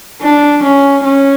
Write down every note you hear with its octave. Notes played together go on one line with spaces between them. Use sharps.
D4
C#4
C#4